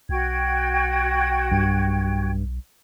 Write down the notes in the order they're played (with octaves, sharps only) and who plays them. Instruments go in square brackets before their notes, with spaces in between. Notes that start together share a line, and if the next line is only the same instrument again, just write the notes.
[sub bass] B1 [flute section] F#4 G5 G#6
[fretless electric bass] G2